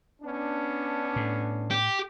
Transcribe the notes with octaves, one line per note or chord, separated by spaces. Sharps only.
B3 C#4 D4
A2
G4